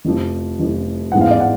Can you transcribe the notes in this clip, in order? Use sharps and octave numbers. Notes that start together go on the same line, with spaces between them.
F1 F2 F3
F1 F2 F3
A1 G#2 G#3 B3 F#5
F5
D5
F#5